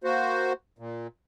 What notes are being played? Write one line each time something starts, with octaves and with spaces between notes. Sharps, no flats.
A#3 F#4 C5
A#2